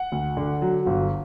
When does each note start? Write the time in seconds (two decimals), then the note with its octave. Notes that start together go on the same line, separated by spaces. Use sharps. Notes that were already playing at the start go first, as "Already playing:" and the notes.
Already playing: F#5
0.12 D2
0.37 D3
0.62 F#3
0.86 G1